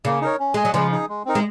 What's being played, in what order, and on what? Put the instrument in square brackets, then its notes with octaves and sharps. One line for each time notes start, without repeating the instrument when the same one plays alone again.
[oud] C#3 [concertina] A#3
[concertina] D#4 A#4 C#5
C#4
[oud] G#3 [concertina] G#4 D#5 G#5
[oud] F#3
[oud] C#3 F3 [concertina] G#3
[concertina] D#4 G#4
G#3
C4 D#4 A#4
[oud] G#3